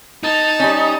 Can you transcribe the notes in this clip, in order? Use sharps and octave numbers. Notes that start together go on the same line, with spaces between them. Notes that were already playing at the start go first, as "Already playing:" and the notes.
D#4 A5
G3 C#4